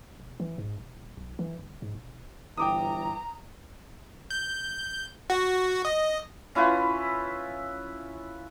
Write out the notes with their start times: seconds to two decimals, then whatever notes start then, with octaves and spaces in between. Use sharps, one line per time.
0.20 E1
0.40 E3
0.58 G#2
0.78 E1
0.97 D#1
1.17 B1
1.39 E3
1.59 G1
1.82 G#2
1.95 E1
2.57 G1 E3 G5 A#5 D6 D#6
4.31 G6
5.30 F#4
5.85 D#5
6.55 C#4 E4 F4 B4